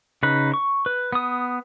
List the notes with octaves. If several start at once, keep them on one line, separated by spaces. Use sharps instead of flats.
C#3 D#4 B4
C#6
B4
B3 D#6